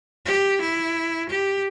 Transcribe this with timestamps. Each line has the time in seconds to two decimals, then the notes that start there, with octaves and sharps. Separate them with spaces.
0.25 G4
0.60 E4
1.29 G4